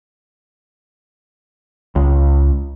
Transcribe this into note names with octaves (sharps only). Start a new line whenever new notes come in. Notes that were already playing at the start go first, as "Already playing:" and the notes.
C#2